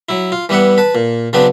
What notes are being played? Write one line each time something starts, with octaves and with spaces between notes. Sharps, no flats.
F#3 E4
F4
E3 G3 B3 E5 F#5
B4 A5
A#2
C#3 F#3 B3 C4 D4 B4